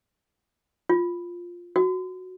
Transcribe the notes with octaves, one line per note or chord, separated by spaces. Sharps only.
F4
F#4